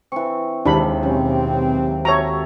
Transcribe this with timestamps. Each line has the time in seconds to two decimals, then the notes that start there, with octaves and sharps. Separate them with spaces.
0.12 E3 C4 C#6
0.65 D#2 C3 G#3 D4 E4 B5
1.03 B2 F#3 C4 C#4
2.05 F#4 A4 C#5 E5 A#5